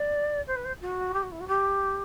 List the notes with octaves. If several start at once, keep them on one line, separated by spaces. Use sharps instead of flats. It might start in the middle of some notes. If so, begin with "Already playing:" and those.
Already playing: D5
C5
B4
C5
F#4
G4
F#4
E4
F#4
G4